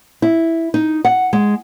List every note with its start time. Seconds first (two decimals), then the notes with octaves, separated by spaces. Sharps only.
0.22 E4
0.74 D#4
1.05 F#5
1.33 G#3